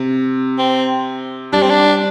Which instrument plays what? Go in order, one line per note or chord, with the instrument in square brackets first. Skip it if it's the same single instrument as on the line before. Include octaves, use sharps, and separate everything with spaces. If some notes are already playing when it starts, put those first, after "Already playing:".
Already playing: [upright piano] C3
[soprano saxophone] C4
[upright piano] G3 [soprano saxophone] D4
[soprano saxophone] C4
D4